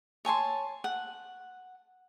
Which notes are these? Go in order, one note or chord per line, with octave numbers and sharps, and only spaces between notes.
C#5 G#5 A5 C6
F#5